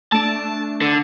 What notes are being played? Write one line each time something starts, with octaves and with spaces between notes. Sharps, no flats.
A3 D4 A5
D3